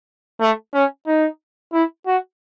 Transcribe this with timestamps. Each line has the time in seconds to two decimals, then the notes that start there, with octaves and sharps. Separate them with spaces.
0.40 A3
0.74 C#4
1.07 D#4
1.73 E4
2.06 F#4